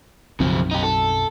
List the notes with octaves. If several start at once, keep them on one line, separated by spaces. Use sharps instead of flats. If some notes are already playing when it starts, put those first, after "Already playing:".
B1 F#2 C#3 F3 C4
D#4 G4
A4